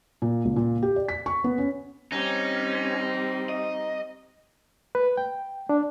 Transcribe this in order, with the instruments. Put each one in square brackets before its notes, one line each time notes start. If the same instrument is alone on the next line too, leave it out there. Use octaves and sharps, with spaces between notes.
[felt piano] A#2
C#2
A#2
G4
D5
B6
C#6
B3
C#4
[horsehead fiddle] G3 C4 [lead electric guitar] C#4 [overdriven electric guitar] D#4
[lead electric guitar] D#5
[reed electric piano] B4
G5
D4